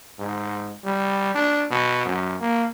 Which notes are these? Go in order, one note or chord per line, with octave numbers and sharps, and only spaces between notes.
G#2
G3
D4
B2
F#2
A#3